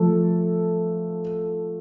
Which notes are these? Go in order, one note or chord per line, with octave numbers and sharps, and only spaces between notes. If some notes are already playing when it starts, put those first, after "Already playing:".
Already playing: F3 A3 A4